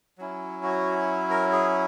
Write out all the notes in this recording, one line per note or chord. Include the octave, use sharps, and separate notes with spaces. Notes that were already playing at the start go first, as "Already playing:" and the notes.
F#3 C#4 E4
F#4
A#4
G#4